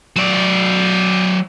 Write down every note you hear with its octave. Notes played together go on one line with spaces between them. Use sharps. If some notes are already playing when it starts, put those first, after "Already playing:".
F#3 D5